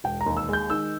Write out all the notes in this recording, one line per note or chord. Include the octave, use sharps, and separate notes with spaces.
E1 G5
A#5
D#2
E6
G#3 G6
D#3 E6